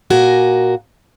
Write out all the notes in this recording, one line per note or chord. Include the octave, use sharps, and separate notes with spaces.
A#2 F#4 A#4 G#5